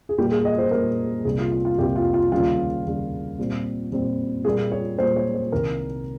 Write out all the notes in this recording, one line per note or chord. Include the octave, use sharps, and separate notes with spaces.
G#4
A#2 G3 A#3 G4
G#4
D#5
C5
A#2 G3 A#3 A#4
C2 C3 G3 A#3 G#4
F4
F4
F4
C2 C3 G3 A#3 G4
F4
F4
D#2 C#3 G3 F4
D#2 C#3 G3
A#2 G3 C4
A#2 G3 C4
A#2 G3 A#3 G#4
C#5
A#2 G3 A#3 C5
C#5
C5
C2 C3 D#3 A#4